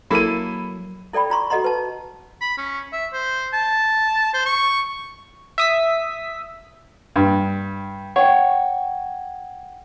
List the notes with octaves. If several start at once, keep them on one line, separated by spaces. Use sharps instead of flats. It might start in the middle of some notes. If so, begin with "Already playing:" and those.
F#3 A#3 E4 A4 B5 D#7
E4 A4 D5 G5 B5
F4 A#5 C6 C#6
F#4 A4 D#5 F#5 A#5 C6
B4 A5
B5
C#4
E5
C5
A5
C5
C#6
E5 D#6 B6
G2
C#5 F#5 G5